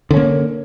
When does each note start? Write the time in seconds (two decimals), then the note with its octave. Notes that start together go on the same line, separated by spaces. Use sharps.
0.11 D3
0.14 C#4
0.17 A#3